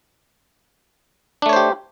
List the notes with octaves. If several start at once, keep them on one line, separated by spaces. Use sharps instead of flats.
A3 D4 G4 C5 C#5